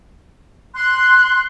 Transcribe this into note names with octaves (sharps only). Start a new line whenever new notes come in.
C6 F#6